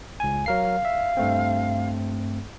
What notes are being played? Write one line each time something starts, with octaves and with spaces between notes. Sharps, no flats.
C#2 G#5
F#3 A#4 F5 C7
E5
G2 A3 C4